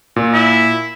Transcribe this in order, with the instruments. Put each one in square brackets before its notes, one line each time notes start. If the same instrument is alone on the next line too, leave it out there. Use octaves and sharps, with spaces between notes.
[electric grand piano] A#2
[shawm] E4